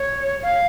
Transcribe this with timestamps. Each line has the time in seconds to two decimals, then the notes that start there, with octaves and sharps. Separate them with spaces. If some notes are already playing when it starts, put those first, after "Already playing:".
Already playing: C#5
0.43 F5